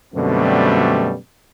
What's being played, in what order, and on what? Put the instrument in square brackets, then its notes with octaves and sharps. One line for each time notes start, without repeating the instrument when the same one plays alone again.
[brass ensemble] F#2 B2 D3 G3 A3 C4